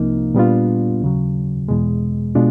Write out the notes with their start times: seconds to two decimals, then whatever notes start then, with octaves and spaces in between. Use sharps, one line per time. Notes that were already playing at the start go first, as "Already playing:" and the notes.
Already playing: C2 C3 F3 A#3 D#4
0.34 A#2 G3 B3 D4 F4
1.02 D#2 C#3 F#3
1.68 E2 B2 G#3
2.35 B2 G#3 B3 D4 F4